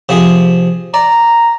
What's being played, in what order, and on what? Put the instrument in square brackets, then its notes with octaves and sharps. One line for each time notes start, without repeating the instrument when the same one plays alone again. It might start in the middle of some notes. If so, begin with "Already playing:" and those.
[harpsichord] C3 F3 G#4
[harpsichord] D5 [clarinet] A#5